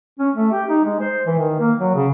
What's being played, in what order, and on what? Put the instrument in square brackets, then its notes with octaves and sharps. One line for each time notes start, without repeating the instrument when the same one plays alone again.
[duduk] C#4
A3
G4
D#4
G#3
C5
E3
D#3
A#3
F#3
C#3